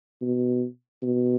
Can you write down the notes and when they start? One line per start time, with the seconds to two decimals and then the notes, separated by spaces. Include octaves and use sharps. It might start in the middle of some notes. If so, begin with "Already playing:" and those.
0.22 B2
1.03 B2